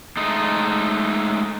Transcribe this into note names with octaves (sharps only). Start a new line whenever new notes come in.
G#3 A3 D#4